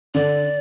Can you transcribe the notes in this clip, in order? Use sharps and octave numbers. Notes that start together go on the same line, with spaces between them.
D3 D5